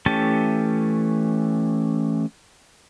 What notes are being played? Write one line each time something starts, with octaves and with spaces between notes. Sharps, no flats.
E3 A3 C#4 G4 A5